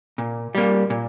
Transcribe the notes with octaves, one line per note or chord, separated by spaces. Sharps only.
A#2
G3 A#3
A#2